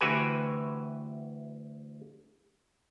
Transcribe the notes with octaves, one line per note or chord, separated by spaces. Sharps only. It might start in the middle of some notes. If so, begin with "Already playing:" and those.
D2 E3 F#4 G4 B4 G#5